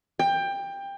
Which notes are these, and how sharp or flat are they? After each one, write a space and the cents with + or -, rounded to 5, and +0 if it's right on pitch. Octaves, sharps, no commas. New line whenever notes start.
G5 +20